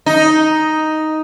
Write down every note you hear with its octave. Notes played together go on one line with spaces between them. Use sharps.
D#4